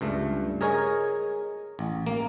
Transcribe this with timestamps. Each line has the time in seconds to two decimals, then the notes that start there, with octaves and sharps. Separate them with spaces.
0.01 C#2 G2 A3
0.61 G#4 A#4 C#5 D#5 G#5
1.79 A1
2.07 A#3